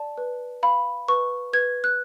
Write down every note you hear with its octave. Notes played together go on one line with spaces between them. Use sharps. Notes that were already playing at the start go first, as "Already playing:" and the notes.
Already playing: D5 A5
B4
F5 B5
B4 C#6
B4 G#6
F#6